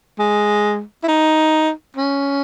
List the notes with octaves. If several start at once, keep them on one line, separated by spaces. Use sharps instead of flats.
G#3
E4
D#4
C#4